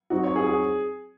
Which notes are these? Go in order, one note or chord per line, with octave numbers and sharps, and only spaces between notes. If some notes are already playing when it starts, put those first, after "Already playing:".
F#3 C4 D#4 F#4
C#5
G#4
G#4